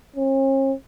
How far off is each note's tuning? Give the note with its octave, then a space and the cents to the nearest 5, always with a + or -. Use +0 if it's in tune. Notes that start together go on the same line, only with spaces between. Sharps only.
C#4 -45